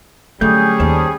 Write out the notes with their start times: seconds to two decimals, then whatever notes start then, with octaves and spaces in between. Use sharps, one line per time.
0.41 D3 F#3 G3 A3 C#4 G#4 G6
0.80 D#2 C5 D5 A5